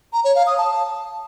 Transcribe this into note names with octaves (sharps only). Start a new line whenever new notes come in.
A#5
C#5
F5
D#6
A5